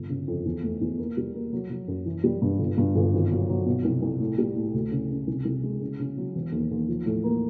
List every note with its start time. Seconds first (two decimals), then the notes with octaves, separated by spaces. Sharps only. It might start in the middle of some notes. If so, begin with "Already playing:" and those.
Already playing: G1
0.09 C#3
0.27 F2
0.45 E2
0.63 A3
0.81 E2
0.98 A#3
1.17 G3
1.34 A#3
1.53 F#3
1.70 F#3
1.88 F#2
2.06 E3
2.24 G3
2.42 G2
2.59 G1
2.78 G2
2.96 G1
3.14 G#1
3.31 F#3
3.49 F#3
3.66 B2
3.84 C2
4.02 C2
4.20 A2
4.38 G3
4.56 A2
4.74 D2
4.91 C#3
5.09 C#3
5.27 C2
5.45 C2
5.63 G#3
5.80 C#3
5.99 C#3
6.17 F#3
6.35 E1
6.52 D#2
6.71 D#2
6.88 F3
7.06 A2
7.24 A#3